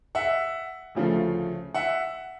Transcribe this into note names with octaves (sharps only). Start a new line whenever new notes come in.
E5 F#5
D2 C#3 F3 A3
E5 F#5